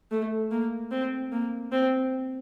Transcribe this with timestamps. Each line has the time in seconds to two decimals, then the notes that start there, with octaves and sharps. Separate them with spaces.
0.11 A3
0.52 A#3
0.91 C4
1.32 A#3
1.72 C4